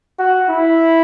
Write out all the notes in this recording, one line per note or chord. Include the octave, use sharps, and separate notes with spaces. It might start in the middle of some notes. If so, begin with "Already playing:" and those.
F#4
E4